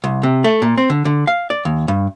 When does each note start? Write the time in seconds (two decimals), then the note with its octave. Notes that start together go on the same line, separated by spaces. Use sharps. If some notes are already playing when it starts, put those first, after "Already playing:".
0.04 C2
0.23 C3
0.44 A3
0.62 A#2
0.78 C4
0.90 D3
1.05 D3
1.27 F5
1.50 D5
1.65 D#2
1.88 G2